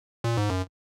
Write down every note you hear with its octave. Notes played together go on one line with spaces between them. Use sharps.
A#2
G#2
F#2